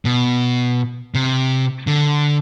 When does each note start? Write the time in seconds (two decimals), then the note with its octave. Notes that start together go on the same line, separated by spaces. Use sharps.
0.05 B2
1.15 C3
1.87 D3